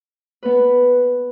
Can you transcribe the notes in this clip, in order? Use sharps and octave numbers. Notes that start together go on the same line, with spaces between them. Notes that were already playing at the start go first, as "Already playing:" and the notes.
B3 B4